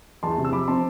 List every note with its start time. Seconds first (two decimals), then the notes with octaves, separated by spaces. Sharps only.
0.23 E2 A5 C6
0.38 C3
0.45 E6
0.53 F3 B5 D6
0.68 C4 A5 C6